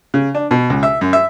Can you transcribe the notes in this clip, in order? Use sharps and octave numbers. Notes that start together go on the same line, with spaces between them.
C#3
D4
B2
C#2
E5
F#2
E5